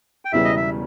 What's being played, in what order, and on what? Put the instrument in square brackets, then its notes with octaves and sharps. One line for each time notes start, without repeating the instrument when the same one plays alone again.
[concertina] G5
[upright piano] E1 E2 C#3 E3 G3 [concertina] E5
[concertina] D#5
E5